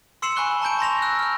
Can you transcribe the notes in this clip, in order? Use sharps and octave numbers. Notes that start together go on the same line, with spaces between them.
C6 E6 C7 C#7 E7 F#7
G#5 B5 C#6 F#6 G7
A5 A#5 C#6 G6 D7
A#5 C6 A#6 F7
E6 F#6
F6 F#6